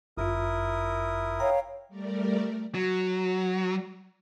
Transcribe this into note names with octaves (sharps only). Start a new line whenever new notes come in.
G1 F#2 E4 F4 A#4 D#6
C#5 F5 G5 A#5
G3 A3 A#4 D5
F#3